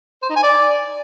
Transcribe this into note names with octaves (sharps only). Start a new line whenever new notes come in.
C5
D#4
G#5
D5